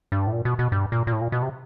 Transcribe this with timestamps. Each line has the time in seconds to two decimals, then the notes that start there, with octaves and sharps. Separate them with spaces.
0.12 G2
0.27 A2
0.33 A#2
0.45 B2
0.59 B2
0.72 G2
0.92 A#2
1.07 A#2
1.12 A2
1.21 A#2
1.32 B2
1.42 C3